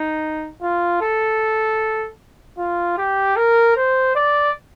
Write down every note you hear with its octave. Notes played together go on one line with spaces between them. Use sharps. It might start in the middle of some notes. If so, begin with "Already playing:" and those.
Already playing: D#4
F4
A4
F4
G4
A#4
C5
D5